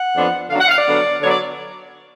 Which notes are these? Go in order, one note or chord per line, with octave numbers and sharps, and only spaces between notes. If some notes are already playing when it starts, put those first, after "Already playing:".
Already playing: F#5
F2 F3 B3 D4
D3 F#3 B3 D4 F5
F#5
F5
D5
D3 F#3 B3 D4
D3 F#3 B3 D4 C#5
D5